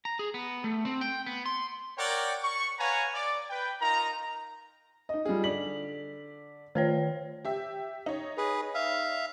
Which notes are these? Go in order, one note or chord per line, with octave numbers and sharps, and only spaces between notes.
A#5
G#4
B3
A3
C4
G5
B3
C6
A#4 C#5 D5 F#5 G5
C#6
B4 C#5 F5 F#5 G#5 A#5
D5
B4 G5
D#4 F4 A#4 A#5
D#4 D#5
G3 F4 G#4
D3 D5 B6 F#7
D#3 F4 B4 C#5
G4 E5
D#4 C#5
G#4 B4
E5 F5